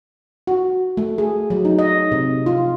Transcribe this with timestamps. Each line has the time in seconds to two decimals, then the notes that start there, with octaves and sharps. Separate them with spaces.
0.47 F#4
0.97 A3
1.18 G#4
1.50 F#3
1.65 D#4
1.79 D#5
2.12 C3
2.46 F4